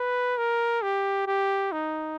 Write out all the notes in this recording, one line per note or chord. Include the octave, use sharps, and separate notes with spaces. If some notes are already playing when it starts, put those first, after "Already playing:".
Already playing: B4
A#4
G4
G4
D#4